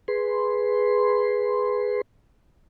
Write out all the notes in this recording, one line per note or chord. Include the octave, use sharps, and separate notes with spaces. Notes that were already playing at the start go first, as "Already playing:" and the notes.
G#4 B4 C6